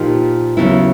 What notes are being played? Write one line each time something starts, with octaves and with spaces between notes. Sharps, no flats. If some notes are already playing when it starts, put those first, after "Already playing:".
Already playing: A#2 F3 A#3 D#4 G4
D#2 C#3 F#3 B3 E4